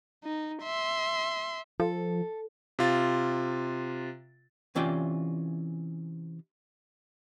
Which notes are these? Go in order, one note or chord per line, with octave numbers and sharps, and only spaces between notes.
D#4
E5 C6
F3 A4
C3 F4 A6
C3 E3 C#4 F4 D5 G5